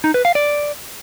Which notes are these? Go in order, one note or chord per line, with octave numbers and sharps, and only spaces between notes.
D#4
B4
F5
D5